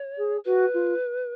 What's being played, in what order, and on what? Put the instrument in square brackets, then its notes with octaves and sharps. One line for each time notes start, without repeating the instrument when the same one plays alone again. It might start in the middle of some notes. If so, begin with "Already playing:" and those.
Already playing: [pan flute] C#5
[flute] G#4
[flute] F#4 [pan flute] B4
[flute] F4